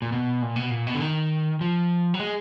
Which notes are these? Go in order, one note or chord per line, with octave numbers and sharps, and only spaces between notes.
A#2
B2
A#2
B2
A#2
B2
D3
D#3
F3
F#3
G#3